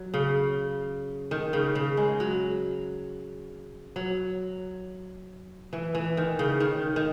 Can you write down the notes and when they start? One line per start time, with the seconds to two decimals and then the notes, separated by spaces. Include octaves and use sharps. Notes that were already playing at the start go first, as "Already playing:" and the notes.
Already playing: F#3
0.14 C#3
1.31 D#3
1.53 C#3
1.75 C#3
1.97 G#3
2.20 F#3
3.96 F#3
5.73 E3
5.95 E3
6.17 D#3
6.39 C#3
6.60 D#3
6.96 D#3